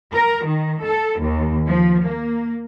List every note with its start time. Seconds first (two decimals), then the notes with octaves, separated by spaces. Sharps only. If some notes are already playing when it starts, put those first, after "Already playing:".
0.13 A#4
0.46 D#3
0.84 A4
1.20 D#2
1.67 F3
2.05 A#3